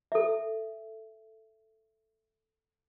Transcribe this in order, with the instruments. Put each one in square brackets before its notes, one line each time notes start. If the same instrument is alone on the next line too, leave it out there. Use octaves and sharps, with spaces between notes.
[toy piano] A4 E5